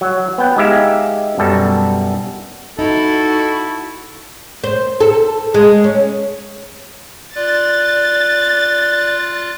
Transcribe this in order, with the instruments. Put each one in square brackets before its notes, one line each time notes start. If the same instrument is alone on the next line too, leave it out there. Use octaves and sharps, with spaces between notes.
[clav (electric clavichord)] F#3
B3 G5
G#3 D#4 G4 E5 F5
F#2 B2 G3 A4
[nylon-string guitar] D#4 [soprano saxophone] E4 [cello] F#4 [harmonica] A4
[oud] C5
A4
G#3
C#4
[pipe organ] F4 F#6 [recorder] D5 [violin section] A6